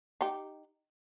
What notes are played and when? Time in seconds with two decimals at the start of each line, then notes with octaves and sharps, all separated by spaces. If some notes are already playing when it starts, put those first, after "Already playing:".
0.21 D#4 G4